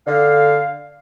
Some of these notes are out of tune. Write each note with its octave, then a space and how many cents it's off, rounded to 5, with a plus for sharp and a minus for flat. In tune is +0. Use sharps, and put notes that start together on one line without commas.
D3 +0 F5 +5